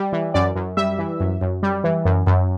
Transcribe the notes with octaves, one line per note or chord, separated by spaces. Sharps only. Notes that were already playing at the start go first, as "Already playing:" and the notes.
Already playing: G3
E3
F#2 D5
F#2
G3 E5
E3
F#2
F#2
G3
E3
F#2
F#2